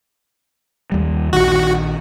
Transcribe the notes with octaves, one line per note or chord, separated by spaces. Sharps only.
D#2 G3
A#1 D#3 F#4